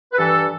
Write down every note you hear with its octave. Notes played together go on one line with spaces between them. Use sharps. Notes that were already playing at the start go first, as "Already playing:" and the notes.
B4
G2 E3 A4